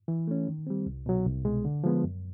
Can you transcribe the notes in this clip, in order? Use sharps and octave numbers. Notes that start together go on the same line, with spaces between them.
E3
A3 C#4
D#3
G3 C4
C2
B2 F#3
C2
B2 G#3
D3
F3 G#3 B3
F#2